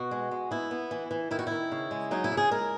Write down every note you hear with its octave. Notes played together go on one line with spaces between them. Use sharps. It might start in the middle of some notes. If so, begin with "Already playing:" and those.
Already playing: B2 F#4
G#3
G#3
B3 E4
B3
E3
E3
D#3 E4
F#4
D#3 E4
C#3
G#3
F#3 D#4
E4
C#3
G#4
G#3 A#4